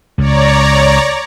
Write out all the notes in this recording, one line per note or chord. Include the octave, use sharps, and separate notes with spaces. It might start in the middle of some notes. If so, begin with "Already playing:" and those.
C#2 C#5 D5 A#5